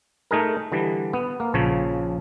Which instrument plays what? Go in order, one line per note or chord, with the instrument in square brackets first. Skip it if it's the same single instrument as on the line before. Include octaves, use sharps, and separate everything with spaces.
[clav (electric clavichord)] A3 D#4 G#4 A#4
D3 E3 G3
B3
A#3
A#1 C#3 F3 C#5